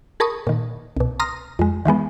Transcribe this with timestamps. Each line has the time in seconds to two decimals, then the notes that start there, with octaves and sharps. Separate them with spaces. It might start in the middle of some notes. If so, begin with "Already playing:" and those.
0.20 G#4 A#4 A5 B5 C#6 D#6
0.47 A#2 D#3
0.97 C2 B2
1.20 A#5 C6 D#6 F6 A#6
1.59 F2 G#3
1.85 D#3 E3 G#3 B3